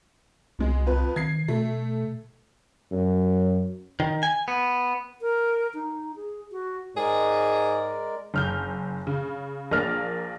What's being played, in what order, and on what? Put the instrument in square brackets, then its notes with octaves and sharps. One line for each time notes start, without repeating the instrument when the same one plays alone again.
[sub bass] C2 [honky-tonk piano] B2 G#3
[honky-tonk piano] F2 B4
[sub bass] D#3 [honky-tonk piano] G#6 C7
[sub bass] B2 [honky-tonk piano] A3
[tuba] F#2
[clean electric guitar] D#3
G#5
B3
[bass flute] A#4
D#4
G#4
F#4
[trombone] G#2 [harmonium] G#3 A#4 D5 [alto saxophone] G#4
[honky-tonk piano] F#1 F6 G6
C#3
A#1 A#3 D5 F6